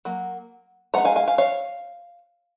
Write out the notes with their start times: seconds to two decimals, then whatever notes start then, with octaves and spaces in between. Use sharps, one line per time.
0.05 F#3 A#3
0.94 G#3 B3 D#4 F#5 A#5
1.05 F5 G#5
1.16 F5 G#5
1.28 F5 G#5
1.38 C#5 F5